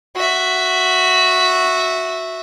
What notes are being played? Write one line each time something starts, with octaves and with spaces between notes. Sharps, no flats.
F#4 E5